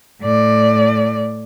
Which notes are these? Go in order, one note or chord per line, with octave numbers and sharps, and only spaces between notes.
A2 D5